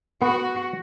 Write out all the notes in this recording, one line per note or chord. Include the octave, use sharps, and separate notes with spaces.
B3 F#4 B4